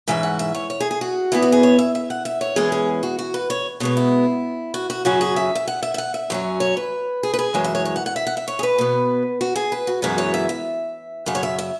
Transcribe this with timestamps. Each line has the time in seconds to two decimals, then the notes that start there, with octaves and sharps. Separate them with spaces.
0.08 G#2 E3 C#4 E5
0.23 F#5
0.39 E5
0.54 C#5
0.70 C#5
0.80 G#4
0.91 G#4
1.01 F#4
1.32 E2 E3 B3 E4
1.42 F#4
1.52 G#4
1.63 C#5
1.79 E5
1.95 E5
2.10 F#5
2.25 E5
2.41 C#5
2.56 E2 E3 G#3 C#4 G#4
2.72 G#4
3.03 F#4
3.19 F#4
3.34 B4
3.50 C#5
3.80 B2 G#3 B3 C#5
3.97 E4
4.74 F#4
4.90 F#4
5.05 F#2 C#3 F#3 C#4 F#4
5.21 G#4
5.36 E5
5.55 E5
5.68 F#5
5.83 E5
5.94 E5
5.98 F#5
6.14 E5
6.30 F#2 F#3 C#4
6.60 C#5
6.77 B4
7.23 G#4
7.34 B4
7.39 G#4
7.54 F#2 E3 G#3 C#5
7.64 E5
7.75 C#5
7.85 C#5
7.96 F#5
8.06 F#5
8.16 E5
8.27 F#5
8.37 E5
8.48 C#5
8.59 G#4
8.63 B4
8.78 B2 B3
9.41 F#4
9.56 G#4
9.72 B4
9.87 F#4
10.02 F#2 E3 G#3 B3 F#4
10.18 C#5
10.34 E5
10.49 E5
11.26 F#2 C#3 F#5
11.35 C#5
11.43 E5
11.58 E5